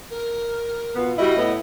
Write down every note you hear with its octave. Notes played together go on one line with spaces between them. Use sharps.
A#4
B2 B3 F4
G3 E4 F#4 D#5
A2 B3 E4